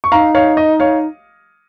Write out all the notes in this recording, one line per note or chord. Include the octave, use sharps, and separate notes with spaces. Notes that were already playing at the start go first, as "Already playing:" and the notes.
C#6
D#4 F5 A#5
C#5 F5
D#5
C#5 F5